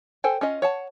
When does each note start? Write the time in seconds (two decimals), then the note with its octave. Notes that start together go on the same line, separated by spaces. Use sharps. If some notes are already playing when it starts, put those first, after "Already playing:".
0.24 A4 C5 G5 G#5
0.41 C#4 F4 D#5
0.62 C#5 F#5 A5